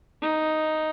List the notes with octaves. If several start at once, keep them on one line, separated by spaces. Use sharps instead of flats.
D#4